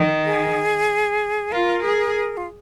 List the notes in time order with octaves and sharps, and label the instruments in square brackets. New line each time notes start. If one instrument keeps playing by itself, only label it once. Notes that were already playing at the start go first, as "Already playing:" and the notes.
Already playing: [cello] D#3
[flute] G#4
[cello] F4 [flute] A#4
[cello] G#4
[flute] F4